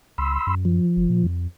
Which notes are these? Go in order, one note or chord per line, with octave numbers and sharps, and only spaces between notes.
C#2 B5 C6 E6
F#2
F3
F#1
A#2
F2